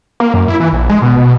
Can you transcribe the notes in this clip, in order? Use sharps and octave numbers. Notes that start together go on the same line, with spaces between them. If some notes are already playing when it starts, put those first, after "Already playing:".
A#3
F#2
E4
E3
A#1
G#3
B2
B2